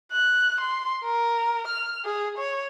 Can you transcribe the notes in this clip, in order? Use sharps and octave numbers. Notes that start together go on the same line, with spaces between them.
F#6
C6
A#4
F6
G#4
C#5